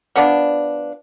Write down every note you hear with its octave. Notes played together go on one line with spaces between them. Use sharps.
F3 B3 D4